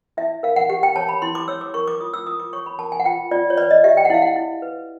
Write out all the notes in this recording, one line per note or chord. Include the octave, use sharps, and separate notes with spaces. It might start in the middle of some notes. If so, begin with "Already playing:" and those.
E4 E5
A#4 F5
F#5
G4 F#5
G5
C#5 A5
B5
E4 C6
D6
C#5 E6
D6
A#4 C#6
D6
F4 D#6
E6
F4 D#6
D6
C#5 C#6
B5
A#4 A5
G#5
F#5
F4 G5
F4 D5
C#5
B4 D5
D#5
G4 E5
G5
F#5
E4 F5
F#5
E4
B4